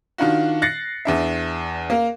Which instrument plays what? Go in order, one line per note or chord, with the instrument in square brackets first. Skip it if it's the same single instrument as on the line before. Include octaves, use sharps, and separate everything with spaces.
[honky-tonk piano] D#3 D4 F4 F#4
F#6 A6 A#6 C7 C#7
E2 D4 E5
A#3 A#4